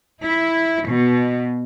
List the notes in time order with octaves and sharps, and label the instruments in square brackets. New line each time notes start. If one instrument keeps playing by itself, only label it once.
[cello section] E4
B2